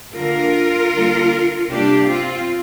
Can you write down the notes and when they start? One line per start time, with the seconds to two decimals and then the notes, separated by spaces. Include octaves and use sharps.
0.16 D3 A#3 F4 A#4
0.94 D3 G3 A#3
1.70 C3 G3 A#3 D4 G4
2.08 C4 F4